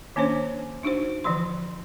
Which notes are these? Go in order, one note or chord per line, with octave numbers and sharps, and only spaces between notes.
D#3 A#3 C#4 D4 C5 C#5
D4 D#4 F#4 C5
D3 E3 F3 C6